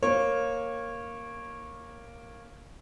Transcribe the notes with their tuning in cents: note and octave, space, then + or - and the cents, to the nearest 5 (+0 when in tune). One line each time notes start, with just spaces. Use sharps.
A#3 +0 C#5 -20